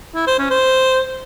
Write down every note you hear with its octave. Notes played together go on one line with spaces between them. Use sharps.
E4
C5
C#4
C5